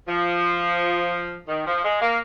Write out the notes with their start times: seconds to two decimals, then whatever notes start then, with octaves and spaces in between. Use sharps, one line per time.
0.07 F3
1.47 D#3
1.65 F3
1.83 G#3
2.00 A#3